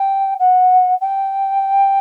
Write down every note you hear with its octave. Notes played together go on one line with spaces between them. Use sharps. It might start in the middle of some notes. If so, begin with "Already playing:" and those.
Already playing: G5
F#5
G5